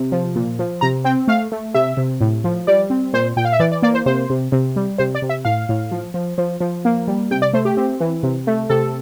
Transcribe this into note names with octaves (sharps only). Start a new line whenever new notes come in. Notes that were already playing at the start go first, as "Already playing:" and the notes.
Already playing: C3
F3
A#2
F3
C3 A#5
C4 G5
A3 F5
A3
C3 E5
C3
A2
F3
G3 D5
C4
A#2 C5
A#2 G5
F5
E5
E3 D5
D5
A#3 D5
C5
C3 C5
C3
C3
G3
C3 C5
D5
C3
E5
A2 F5
A2
F3
F3
F3
F3
A#3
G3
C3 G5
D5
A3 C5
G4
C4
E3
C3
A3
C3 A4